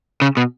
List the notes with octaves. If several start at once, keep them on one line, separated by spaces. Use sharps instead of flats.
C#3
B2